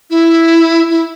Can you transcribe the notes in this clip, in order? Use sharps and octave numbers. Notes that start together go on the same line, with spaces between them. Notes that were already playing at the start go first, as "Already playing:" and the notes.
E4
E4